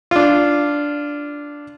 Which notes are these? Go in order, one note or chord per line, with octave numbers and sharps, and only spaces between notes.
D4 F4